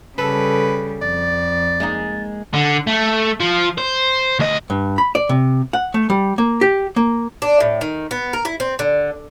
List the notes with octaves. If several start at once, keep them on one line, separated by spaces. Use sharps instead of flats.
C#3 G3 A4 B4
F2 D5 A6
G#3 A#3 D#4
D3
A3
F3
C5
D2 D#5
G2
B5
D5
C3
F#5
A3
G3
A#3
G4
A#3
D4
A2
D#3
B3
A#4
E4
C4
D3